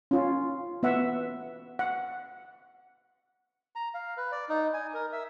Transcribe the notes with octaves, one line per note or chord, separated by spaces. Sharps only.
C#4 F4
B3 E5 F#5
F#5
A#5
F5
B4
D5
D#4
G#5
A#4
E5